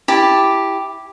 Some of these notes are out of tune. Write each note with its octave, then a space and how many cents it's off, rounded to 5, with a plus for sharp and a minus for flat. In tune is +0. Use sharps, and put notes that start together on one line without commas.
E4 +0 G4 +0 A5 +0